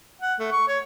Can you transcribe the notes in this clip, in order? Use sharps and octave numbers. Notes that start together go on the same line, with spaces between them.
F#5
A3
C#6
C#5